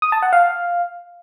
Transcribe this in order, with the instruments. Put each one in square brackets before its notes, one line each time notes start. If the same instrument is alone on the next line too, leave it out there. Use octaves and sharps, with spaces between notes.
[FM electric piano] D#6
A5
F#5
F5